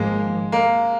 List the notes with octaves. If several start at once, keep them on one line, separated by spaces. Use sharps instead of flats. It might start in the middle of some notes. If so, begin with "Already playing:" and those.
Already playing: G#1 G#2 F3 G#3 A#3
A#3